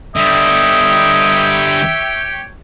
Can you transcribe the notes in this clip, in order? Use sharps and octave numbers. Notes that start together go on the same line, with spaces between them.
D3 G3 G4 C#5 D#5 E5 G5